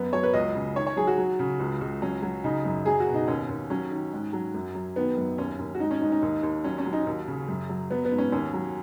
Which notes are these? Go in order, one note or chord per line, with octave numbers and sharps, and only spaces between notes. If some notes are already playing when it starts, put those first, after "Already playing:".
Already playing: F#2 B3
F#3 C#5
B4
C#2 D#5
C#3
D#3 C#5
C#5
F#3 G#4
F#4
F#3
C#3
C#2
C#2
F#3 C#4
F#3
C#3 D#4
F#2
F#3 G#4
F#4
B2
D#4
D#2 C#4
D#2
F#3 C#4
D#3
G#2
F#3
F#2
F#3
D#3 B3
F#2
D#2 C#4
D#2
F#4
G#2 D#4
C#4
G#2 D#4
D#4
D#2
D#2
F#3 C#4
C#4
F#3
D#4
D#2
C#3
F#2
F#3
F#3 B3
B3
G#2
C#4
D#2 C#4
F#3